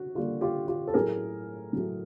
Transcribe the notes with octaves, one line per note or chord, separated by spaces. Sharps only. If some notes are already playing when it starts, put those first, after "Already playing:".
Already playing: D3 F#4
D3 G3 A#3 F4
F4 G4
F4 G4
A4
A2 F#3 A3 G#4 A#4
A2 F#3 A3